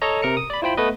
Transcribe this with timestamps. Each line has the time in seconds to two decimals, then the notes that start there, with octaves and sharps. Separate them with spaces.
0.02 A4 C#5 D#5 A#5
0.22 C3 A#4 A#5 C#7
0.37 D#6
0.50 D5 B5
0.62 E4 F4 C5 G5 B5
0.77 A3 B3 B4 D#5